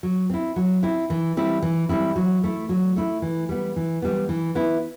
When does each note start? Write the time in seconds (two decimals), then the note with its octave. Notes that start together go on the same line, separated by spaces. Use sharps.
0.03 F#3
0.30 C4 E4
0.56 F#3
0.83 C4 E4
1.10 E3
1.37 G3 C4 E4
1.62 E3
1.89 G3 C4 E4
2.16 F#3
2.43 A3 E4
2.69 F#3
2.96 A3 E4
3.22 E3
3.49 G3 B3
3.76 E3
4.02 G3 B3
4.29 E3
4.55 B3 E4